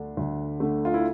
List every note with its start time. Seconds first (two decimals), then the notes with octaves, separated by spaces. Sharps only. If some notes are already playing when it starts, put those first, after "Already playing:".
Already playing: D2 D3 A3 D4
0.17 D2
0.60 D3 A3
0.85 F4
0.94 E4